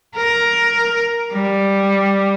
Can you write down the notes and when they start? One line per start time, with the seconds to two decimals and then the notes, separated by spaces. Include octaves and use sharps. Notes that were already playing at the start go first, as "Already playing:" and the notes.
0.16 A#4
1.33 G3